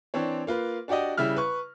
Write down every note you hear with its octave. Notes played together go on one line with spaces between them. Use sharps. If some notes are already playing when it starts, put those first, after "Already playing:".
E3 C4 D4 C#5
A#3 F4 B4
D4 F#4 G4 D5 D#5
C#3 G3 E4 E5 F6
B4 C#6